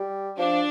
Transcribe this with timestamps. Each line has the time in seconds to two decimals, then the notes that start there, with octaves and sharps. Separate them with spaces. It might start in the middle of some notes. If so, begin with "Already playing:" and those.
Already playing: G3
0.38 F3 D4